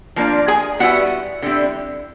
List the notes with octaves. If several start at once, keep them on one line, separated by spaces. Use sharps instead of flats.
F3 A#3 D4
G#4 G#5
B2 G3 B3 E4 F#4 F#5
D3 G3 C4 E4